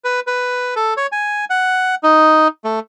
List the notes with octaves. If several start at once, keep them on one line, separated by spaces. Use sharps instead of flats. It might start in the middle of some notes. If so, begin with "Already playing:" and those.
B4
B4
A4
C#5
G#5
F#5
D#4
A3